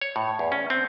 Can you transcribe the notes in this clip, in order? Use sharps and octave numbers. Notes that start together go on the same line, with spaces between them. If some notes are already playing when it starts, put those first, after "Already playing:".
C#5
A2
E2
C#4
C4